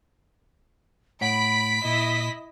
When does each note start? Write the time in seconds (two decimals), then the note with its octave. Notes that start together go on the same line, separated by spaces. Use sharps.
1.21 A2 C#5 F#5 B5 B6 D7
1.85 A#2 E4 D#5